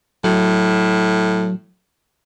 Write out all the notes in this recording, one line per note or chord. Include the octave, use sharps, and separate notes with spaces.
A2 F#3